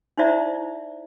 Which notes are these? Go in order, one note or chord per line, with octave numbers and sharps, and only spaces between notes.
D#4 E4 C5 D5 E5 A#5